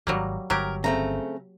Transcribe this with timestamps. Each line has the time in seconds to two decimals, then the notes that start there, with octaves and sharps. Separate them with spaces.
0.07 G#1 F#3 G3 A#3
0.50 G1 F#3 G4 A#4
0.84 C#3 A3 C4 A#5